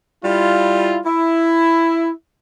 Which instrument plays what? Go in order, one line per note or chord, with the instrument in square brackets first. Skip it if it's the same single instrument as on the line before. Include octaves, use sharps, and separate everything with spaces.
[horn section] G3 E4 F4
E4